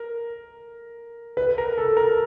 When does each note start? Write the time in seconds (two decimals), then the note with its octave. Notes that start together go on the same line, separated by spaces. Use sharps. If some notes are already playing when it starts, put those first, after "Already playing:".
Already playing: A#4
1.37 B4
1.58 A#4
1.78 A4
1.97 A#4